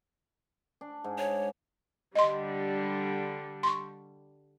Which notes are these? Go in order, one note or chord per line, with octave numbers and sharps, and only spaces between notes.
D4
G#2
C#5
D3 G3 D#5 C6
C6 C#6